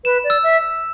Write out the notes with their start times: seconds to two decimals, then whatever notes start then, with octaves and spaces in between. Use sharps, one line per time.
0.04 B4 E7
0.24 D5
0.30 E6
0.43 E5